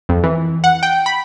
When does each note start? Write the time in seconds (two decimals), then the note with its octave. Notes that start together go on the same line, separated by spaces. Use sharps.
0.09 F2
0.24 E3
0.64 F#5
0.83 G5
1.06 B5